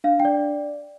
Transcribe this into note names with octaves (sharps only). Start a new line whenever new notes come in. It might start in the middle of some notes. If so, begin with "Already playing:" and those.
D4 F5
G5
D5